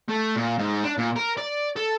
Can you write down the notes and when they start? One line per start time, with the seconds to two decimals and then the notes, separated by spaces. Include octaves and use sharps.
0.09 A3
0.36 A#2
0.59 G#2
0.84 D4
0.98 A#2
1.16 A#4
1.37 D5
1.76 A4